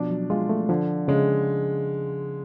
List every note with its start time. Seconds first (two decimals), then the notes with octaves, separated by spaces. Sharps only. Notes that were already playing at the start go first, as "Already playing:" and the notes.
Already playing: B2 F3 D4
0.11 F#3
0.30 G#3 F4
0.49 A3
0.69 D3 F3
1.08 C#3 G#3